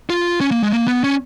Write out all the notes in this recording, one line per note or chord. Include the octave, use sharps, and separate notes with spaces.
F4
C#4
A#3
G#3
A#3
B3
C#4